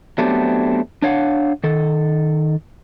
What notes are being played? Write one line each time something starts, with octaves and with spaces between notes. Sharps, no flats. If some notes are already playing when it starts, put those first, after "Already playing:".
F#3 A3 B3 C4 D4 G4
D4 C#5 F5 F#5
D#3 A4